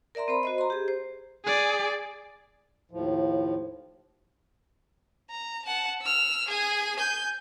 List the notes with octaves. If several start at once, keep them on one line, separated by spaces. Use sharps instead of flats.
A#4 D5 E5 A#5 C6
C4 C5 B5
F#4 C5 D#5
A#5 C6
G4 G#4
C5
G#4 D5
D#2 A2 F3
A#5
F#5 A5
E6 F6
G#4 G#5
G#5 G6